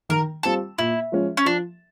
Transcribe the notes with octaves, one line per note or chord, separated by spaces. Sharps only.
D#3 A#4
G3 C4 F4 A4
A#2 E4
F3 G#3 C#4
C#4
F3 D4